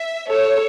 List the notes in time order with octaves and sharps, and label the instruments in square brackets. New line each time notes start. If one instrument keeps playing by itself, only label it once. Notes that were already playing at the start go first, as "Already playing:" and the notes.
Already playing: [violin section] E5
[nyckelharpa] A4 [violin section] C#5